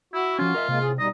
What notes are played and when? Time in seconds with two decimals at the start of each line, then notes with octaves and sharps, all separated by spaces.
0.14 E4 F#4
0.39 F3 C#4 F4
0.55 A#4 D#5 E5
0.68 C3 G#3 A#3
0.81 A2 G#4
0.99 B2 G3 D#4 D#5